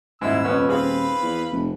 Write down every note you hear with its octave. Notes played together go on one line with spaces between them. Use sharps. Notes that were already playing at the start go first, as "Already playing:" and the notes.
D#1 G#2 E4 E6
F2 B3 C#4
C4 G#4 B4 F5 B5
E2
F1